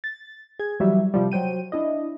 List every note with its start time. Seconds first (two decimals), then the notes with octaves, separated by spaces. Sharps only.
0.04 A6
0.59 G#4 G#6
0.80 E3 F#3 G3 E5
1.14 C3 F3 G3
1.32 F#3 C5 G5 D#7
1.72 D4 E4 D#5